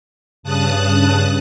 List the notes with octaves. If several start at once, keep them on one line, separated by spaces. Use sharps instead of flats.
G2 C#3 A5 D#6 F#6